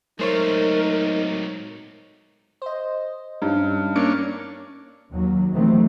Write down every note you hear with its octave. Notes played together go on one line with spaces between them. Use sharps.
F#3 G#3 A3 D#4 A#4 C5 C#5
C5 D#5
G2 G3 C#4 D#4
A#3 C#4 D4 C#7
D#2 F#3
C3 D#3 E3 F#3 A3 C4